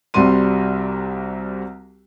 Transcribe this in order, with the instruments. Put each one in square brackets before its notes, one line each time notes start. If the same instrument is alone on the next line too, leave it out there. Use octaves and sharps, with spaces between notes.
[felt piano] C2 C3 G3 F#4 C6 D#7